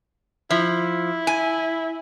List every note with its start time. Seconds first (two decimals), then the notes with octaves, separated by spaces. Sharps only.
0.50 F3 E4
1.27 G#5